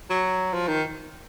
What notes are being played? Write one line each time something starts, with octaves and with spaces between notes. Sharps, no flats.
F#3
F3
D#3